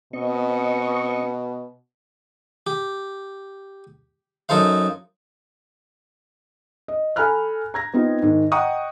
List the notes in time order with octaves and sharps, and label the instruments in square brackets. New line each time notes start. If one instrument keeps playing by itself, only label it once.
[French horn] B2 [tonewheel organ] C4 D#5 C#6
[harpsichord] G4
F#2 D#4 A4 C5 F5
[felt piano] D#5
A4 G#5 A#5 B5 F6 F#6
A#5 G#6 A#6
B3 C4 D#4 F4
G#2 D#3
D#5 F#5 G5 A#5 C#6 D#6